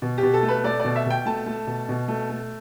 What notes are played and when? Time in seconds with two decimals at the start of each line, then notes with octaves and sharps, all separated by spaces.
0.02 B2
0.18 G4
0.23 B2
0.34 A4
0.43 A3
0.48 B4
0.64 A3 D5
0.80 B2 D5
0.96 E5
1.06 B2 G5
1.26 A3 A5
1.46 A3
1.67 B2
1.89 B2
2.08 A3
2.30 A3